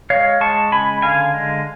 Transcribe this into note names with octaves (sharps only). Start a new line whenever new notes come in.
G#3 C#5 F5
G#3 A5 C#6
C#3 G#5 B5
D3 F5 G#5
G#3